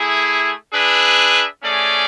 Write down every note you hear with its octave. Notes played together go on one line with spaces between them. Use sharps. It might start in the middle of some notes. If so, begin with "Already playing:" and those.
Already playing: A3 E4 G#4
D4 G#4 B4 E5
A3 C#4 G#4 D5